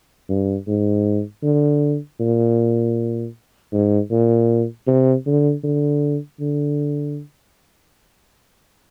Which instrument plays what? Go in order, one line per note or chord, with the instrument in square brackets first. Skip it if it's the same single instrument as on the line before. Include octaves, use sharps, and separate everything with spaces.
[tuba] G2
G#2
D3
A#2
G#2
A#2
C3
D3
D3
D3